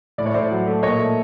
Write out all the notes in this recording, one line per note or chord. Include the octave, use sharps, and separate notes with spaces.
A2 D5
C#5
A2 C5 D5
F#3
A3
A#2 C#5 D#5
A3